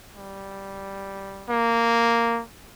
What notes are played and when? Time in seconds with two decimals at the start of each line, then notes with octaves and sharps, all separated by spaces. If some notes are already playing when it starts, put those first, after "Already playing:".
0.15 G3
1.49 A#3